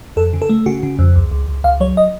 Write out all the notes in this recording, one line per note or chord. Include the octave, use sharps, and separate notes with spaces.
F2 A4
C#3
A4
A3
C#3 F#4
C#3
F2
C#2
C#2
C#2
C#2 F5
F#3 C#5
D#5